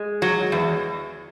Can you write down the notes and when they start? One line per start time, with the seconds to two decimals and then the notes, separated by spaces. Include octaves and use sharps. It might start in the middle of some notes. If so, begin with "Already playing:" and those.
Already playing: G#3
0.22 F#3
0.52 E2